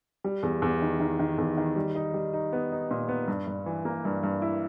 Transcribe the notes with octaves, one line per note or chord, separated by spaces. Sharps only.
G3
E2
E2
D#3
D#3
D#3
E2
D#3
G3
D#4
G3
D#4
B3
D#4
A#2
B3
G2
G2
E3
A#3
G2
G2
E4